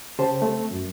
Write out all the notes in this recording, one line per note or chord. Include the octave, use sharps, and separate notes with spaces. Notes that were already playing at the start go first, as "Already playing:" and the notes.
C#3 G4 C5 A5
A3 C4
F#2